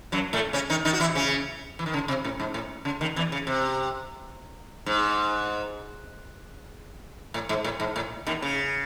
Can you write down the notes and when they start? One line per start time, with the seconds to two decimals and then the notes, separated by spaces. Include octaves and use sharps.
0.12 F#2 F#3
0.33 A2 A3
0.53 C#3 C#4
0.70 D#3 D#4
0.85 D#3 D#4
0.93 F#4
1.00 E3 E4
1.15 C#3 C#4
1.79 E3
1.86 D#3
1.94 C#3
2.08 C3
2.24 A2
2.40 G#2
2.54 A2
2.85 C#3
3.01 D#2 D#3
3.16 E2 E3
3.32 C#3
3.47 C3
4.86 G#2
7.34 A2
7.49 G#2
7.64 A2
7.80 G#2
7.96 A2
8.27 D#2 D#3
8.42 C#3